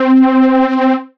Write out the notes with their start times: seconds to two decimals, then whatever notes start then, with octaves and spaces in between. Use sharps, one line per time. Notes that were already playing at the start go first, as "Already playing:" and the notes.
Already playing: C4